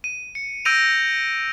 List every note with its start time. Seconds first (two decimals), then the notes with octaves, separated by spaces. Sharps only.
0.04 D#7
0.35 C#7
0.65 E6 G6 A#6 D7 D#7 F7